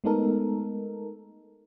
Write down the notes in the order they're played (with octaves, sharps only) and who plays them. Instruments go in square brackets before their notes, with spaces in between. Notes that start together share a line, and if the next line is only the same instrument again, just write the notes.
[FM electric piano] G#3 A3 B3 D#4 A4 A#4